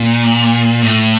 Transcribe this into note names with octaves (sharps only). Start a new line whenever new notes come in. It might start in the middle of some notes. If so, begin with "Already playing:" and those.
Already playing: A#2
A2